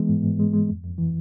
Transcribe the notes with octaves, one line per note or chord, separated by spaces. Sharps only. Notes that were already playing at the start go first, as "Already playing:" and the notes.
Already playing: E3 G#3 B3
G#2
G#2
G#3
G#3
F2
F2
E3